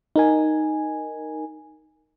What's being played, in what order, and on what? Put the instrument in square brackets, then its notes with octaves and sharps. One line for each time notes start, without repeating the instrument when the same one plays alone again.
[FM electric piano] D#4 A#4 G#5